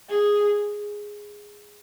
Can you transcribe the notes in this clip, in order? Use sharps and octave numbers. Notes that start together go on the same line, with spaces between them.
G#4